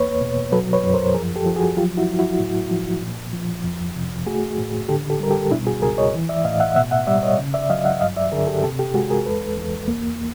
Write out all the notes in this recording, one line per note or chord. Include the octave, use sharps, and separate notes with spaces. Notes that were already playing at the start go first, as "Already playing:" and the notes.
Already playing: E2 A#3 B4 C#5
B2
F#3 A4 B4
B4 C#5
F#2
A#4 C5
F3 G#4 A#4
G4 A4
F3
F#4 G#4
F#3 F4 G4
E4 F#4
F#3
E4 F#4
A2
F3
A#2
F3
F2
C3
A3 F#4 G#4
A2
D3 G4 A4
G4 A4
G3 A#4
G4 A4
B2 D4 E4
F#4 G#4
C#2 G#4 A#4
C#5 D#5
E3
D5 E5
A2 D#5 F5
E5 F#5
B2 E5 F#5
E5 F#5
G3 D5 E5
C#5 D#5
C#3
D5 E5
F#3 D#5 F5
E5 F#5
G2 D#5 F5
D5 E5
D3 G#4 A#4
G4 A4
C3 G4 A4
G4 A4
G#3 F#4 G#4
G#4 A#4
E2 A4 B4
E2
A#3